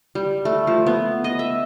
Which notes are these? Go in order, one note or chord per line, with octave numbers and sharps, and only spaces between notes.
G3
A3
F3
B3
D#5
E5